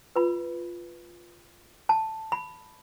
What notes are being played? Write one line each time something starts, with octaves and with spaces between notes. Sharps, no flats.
F4 B4 B5
A5
B5